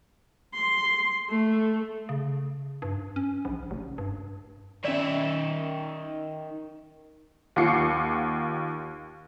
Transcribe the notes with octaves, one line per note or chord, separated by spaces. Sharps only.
C6
A3
C#3
G2
C#4
A#1
F1
G2
D#3 C#4 D5 E5
D#2 F4 F#5 D6 C7 C#7